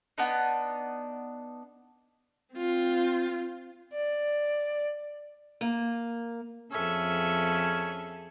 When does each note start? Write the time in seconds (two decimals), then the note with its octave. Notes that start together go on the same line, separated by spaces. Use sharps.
0.18 B3 D4 D#4
2.55 C4 F4
3.94 D5
5.61 A#3
6.71 F2 C#4 G#4 A4 E5